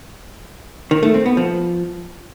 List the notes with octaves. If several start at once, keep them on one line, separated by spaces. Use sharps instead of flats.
D#3
A3
C4
B3
F3